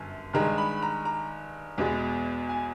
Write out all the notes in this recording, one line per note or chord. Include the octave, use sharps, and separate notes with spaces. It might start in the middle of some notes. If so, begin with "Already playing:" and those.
Already playing: G1 F#2
G2 D#3 G#3 A#5
B5
A#5
A#5
E2 B2 G#3 B3
G#5